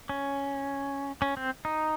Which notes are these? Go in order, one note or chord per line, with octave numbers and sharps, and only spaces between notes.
C#4
C#4
C4
D#4